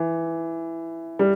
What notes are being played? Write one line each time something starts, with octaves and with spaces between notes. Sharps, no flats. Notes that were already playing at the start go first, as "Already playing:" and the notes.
Already playing: E3
G3